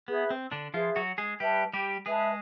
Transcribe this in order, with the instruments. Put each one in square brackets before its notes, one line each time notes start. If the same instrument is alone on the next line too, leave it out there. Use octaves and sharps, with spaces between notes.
[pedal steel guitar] B3 [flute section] G#4 B4 E5
[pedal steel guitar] C4
D3 D4
[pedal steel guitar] F3 F4 [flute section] G#4 B4 E5
[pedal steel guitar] F#3 F#4
G#3 G#4
[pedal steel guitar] G3 G4 [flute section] B4 E5 A5
[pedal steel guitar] G3 G4
[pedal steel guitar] G#3 G#4 [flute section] B4 E5 A5